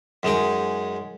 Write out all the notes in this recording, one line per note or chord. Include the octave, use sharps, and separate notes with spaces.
F#2 G#3 D#4 G5